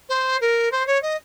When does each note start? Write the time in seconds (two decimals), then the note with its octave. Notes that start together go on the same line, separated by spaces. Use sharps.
0.09 C5
0.41 A#4
0.71 C5
0.87 C#5
1.02 D#5